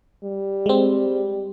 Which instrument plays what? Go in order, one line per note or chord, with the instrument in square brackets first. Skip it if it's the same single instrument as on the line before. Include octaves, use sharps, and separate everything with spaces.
[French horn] G3
[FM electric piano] G#3 C4